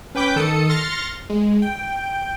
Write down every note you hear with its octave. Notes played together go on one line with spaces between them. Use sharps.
C#4 B4 G5 D6 G6 B6
D#3 A4 D#6 C#7
C6 F6 A6 A#6 C#7
G#3
G5